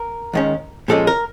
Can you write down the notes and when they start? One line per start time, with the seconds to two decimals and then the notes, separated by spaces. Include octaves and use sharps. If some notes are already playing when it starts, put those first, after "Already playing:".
Already playing: A#4
0.33 D#2 D#3 G#3 C#4
0.88 A#2 F3 G#3 C#4 A4
1.07 A#4